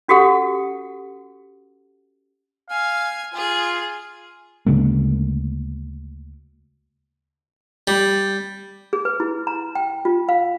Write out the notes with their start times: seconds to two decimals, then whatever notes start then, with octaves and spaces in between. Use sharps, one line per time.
0.08 C#4 F#4 G4 A4 F#5
2.70 F5 G#5
3.34 F4 G#4
4.66 D2 C#3 G#3 A#3
7.87 G3
8.93 G#4
9.05 B4
9.20 E4
9.47 A#5
9.75 G5
10.05 F4
10.29 F5